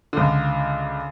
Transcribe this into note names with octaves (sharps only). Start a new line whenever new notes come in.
C#2 D3